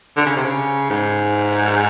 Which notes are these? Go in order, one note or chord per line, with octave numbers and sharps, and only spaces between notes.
D3
C#3
C3
C#3
G#2